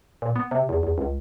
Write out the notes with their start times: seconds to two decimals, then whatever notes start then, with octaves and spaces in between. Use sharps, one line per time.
0.22 A#2
0.36 B3
0.51 C3
0.69 E2
0.83 E2
0.98 C#2